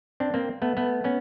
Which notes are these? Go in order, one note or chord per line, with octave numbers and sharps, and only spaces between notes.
C4 D4
A#3 C4
A3 B3
A3 B3
B3 C#4